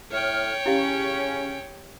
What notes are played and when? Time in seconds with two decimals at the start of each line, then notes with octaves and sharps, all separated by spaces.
0.11 A2 C#5 G5 F6
0.66 C#3 C#4 E4 G4 F5